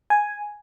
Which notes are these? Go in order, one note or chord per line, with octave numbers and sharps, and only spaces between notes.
G#5